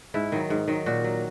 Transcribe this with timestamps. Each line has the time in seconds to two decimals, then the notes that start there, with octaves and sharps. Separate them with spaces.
0.14 G#2 E4
0.32 D#3 F#3
0.50 G#2
0.68 D#3 F#3
0.86 A#2 F#4
1.04 F#3